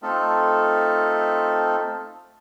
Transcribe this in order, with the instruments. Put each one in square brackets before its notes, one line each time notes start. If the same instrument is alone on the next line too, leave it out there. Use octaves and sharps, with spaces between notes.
[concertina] A3 C4 D#4 F4 A4